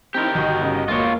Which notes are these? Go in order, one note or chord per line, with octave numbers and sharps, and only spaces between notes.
C4 D#4 E4 G4 A#4
G1 D#3 F#4 D#5
C#3 D#4
E1 A#3 F4 C#5